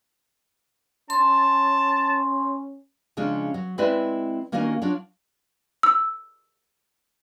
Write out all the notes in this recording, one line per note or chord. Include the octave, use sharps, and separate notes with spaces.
C#4 A5 C6
C#3 F3 G#3 C#4 D4
F#3
G#3 C4 E4 B4 D5 E5
D#3 A#3 C#4 D4 F#4 G#5
F#3 D4 F4 C#5
E6